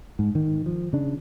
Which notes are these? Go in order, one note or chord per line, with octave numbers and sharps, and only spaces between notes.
G#2
D#3
F3
C#3 D4